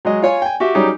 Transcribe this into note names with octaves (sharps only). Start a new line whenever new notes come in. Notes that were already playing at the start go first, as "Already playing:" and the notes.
F#3 G#3 D#5
F4 C#5 G#5
G5 G#5
F#4 G4 E5
F#3 G3 C#4 D#4 G4 G#4